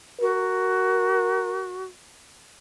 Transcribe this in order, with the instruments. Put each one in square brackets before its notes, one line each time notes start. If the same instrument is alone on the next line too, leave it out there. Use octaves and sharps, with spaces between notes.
[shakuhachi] F#4 [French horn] A#4